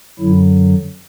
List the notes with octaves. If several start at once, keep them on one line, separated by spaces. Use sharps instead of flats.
F#2 D3 F#3 E4